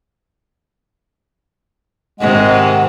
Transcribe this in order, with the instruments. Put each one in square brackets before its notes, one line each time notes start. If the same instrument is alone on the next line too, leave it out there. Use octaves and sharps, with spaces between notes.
[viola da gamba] G#2 C3 D#3 [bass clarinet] G#3 [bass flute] F#5